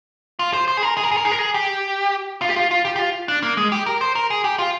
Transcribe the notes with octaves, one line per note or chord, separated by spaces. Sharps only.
F4
C5
C5
G#4
A#4
G#4
A#4
G#4
A#4
G#4
A#4
G#4
G4
F4
G4
F4
F4
G4
G4
F4
D4
A#3
G#3
G4
A#4
C5
A#4
G#4
G4
F4